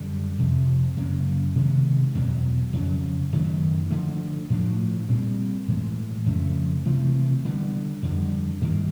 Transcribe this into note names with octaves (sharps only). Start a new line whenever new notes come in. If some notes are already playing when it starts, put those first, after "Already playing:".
Already playing: F#2 D3 G3
F2 C3 F3
F#2 C#3 F#3 A#3
C3 D#3 G#3 B3
E2 B2 F#3
F2 C#3 F#3
F#2 D#3 F#3 A3
D3 F3 A3
A2 F3 A3 D4
A#2 G3 C4
A2 E3 G#3
F2 C#3 F3 A3
C3 E3 A3 C4
D3 G3 B3
F2 D3 G3
G2 D#3 G3 A#3